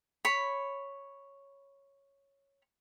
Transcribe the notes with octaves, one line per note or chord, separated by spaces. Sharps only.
C#5 B5